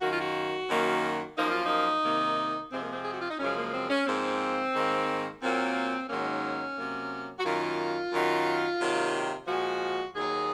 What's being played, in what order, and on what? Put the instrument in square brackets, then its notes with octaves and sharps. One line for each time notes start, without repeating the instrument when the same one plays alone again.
[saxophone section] F#2 D#3 A#3 F#4
F4
F#4
F#2 D#3 A#3
F#2 F3 A#3 D#4
F4
D#4
C3 D#3 A#3
C3 F3 G#3 C4
A#3
C4
G#4
F#4
F4
D#4
F#2 C#3 F3 G#3 C#4
A#3
C4
C#4
G#2 F3 A#3 C4
G#2 D#3 A#3
A#2 F#3 A#3 C4
G#2 D#3 F#3 A#3 C#4
C3 F#3 A#3
F#4
F#2 D#3 A#3 F4
F#2 D#3 F#3
C3 D#3 F#3 A#3
A#2 F3 G#3 F#4
D#2 D#3 F#3 A#3 G#4